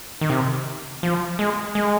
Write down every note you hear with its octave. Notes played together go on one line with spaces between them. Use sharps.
D#3
C3
F3
G#3
G#3